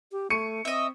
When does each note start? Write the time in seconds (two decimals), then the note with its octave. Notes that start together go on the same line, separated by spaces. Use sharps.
0.12 G4
0.30 A3 C#6 C#7 D#7
0.65 C4 D#5 E5